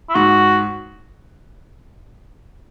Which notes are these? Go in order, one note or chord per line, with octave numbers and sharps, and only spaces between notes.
E4
G#2 F#4